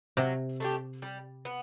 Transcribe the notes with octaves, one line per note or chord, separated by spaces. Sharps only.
C3 F#3
A3 D4 G4
G3
B3